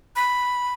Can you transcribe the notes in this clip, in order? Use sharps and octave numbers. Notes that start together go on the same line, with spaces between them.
B5